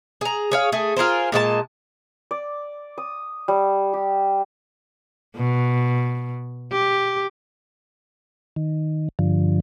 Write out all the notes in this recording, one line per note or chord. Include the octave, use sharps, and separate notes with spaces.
G#4 A#5
G#4 C#5 F5
A3 G#4
F4 G#4 A#4 C5
A#2 G#3 F#4 A5
D5
D#6
G3
G4
B2
G4
D#3
G2 D3 F3